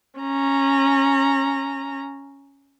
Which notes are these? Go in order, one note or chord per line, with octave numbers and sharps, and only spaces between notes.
C#4 A#5